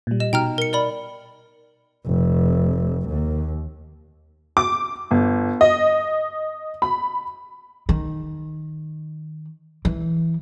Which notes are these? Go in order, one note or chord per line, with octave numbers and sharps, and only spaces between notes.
A#2 G3
D#5 E7
B2 D#4 G5 A#5 F6
A#4 C#7
A#4 D5 B5
F1
D#2
D6
G1
D#5
B5
D#3
E3